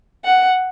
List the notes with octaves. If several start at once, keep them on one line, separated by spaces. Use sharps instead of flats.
F#5